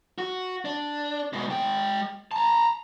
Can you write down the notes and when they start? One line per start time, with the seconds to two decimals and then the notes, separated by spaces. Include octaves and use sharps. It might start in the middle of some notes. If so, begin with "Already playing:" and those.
0.18 F#4
0.65 D4
1.33 G#2 B2
1.50 G#3 G5
2.31 A5 A#5